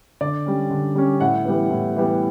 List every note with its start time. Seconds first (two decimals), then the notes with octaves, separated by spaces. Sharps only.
0.21 D3 D5
0.46 G3 C#4
0.70 D3
0.95 G3 C#4
1.20 A2 F#5
1.45 E3 G3 B3
1.70 A2
1.96 E3 G3 B3